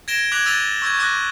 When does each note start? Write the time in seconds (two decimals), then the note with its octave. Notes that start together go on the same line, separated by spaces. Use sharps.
0.08 G#6 A#6 D7 E7 G7
0.32 D6 F#6 G#6 B6 F7 F#7
0.46 E6 A6 B6 D#7 F7 G7
0.82 C#6 E6 G6 G#6
0.99 D6 E6 F#6 A#6